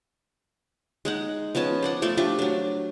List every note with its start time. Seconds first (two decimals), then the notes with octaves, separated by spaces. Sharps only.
1.05 G#3 D#4 F#5
1.55 F3 B3 C#4 A5
1.83 C5 D5 F#5
2.02 F3 A3 A4 D5
2.17 A3 D4 F4 G4
2.39 F#3 D4